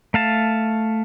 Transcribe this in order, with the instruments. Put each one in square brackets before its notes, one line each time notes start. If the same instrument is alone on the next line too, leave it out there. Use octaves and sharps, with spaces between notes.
[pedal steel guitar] A3 F5 A5